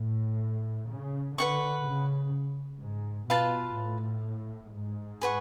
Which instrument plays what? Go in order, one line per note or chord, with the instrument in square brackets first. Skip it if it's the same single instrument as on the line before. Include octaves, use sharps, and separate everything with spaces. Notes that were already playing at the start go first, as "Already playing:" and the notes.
Already playing: [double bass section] A2
C#3
[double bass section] D3 [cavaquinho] B4 F#5 C#6
[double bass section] C#3
G#2
[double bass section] B2 [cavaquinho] F4 B4 F5 A5
[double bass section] A2
G#2
[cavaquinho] G#4 B4 F#5 C#6